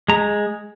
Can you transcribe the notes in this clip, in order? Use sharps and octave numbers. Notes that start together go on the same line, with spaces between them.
G#3 A#5